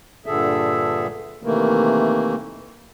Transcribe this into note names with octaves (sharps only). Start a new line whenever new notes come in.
G2 A#2 D3 G#4 A4 E5
C3 D#3 E3 A3 A#3